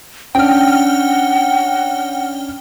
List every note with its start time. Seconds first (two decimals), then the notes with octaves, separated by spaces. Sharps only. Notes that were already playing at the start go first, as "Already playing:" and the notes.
0.35 C#4 D4 F#5 G5 F6